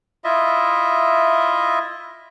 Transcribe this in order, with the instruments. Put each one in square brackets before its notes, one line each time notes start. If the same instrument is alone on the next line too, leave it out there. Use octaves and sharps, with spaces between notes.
[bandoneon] E4 F4 D#5 E5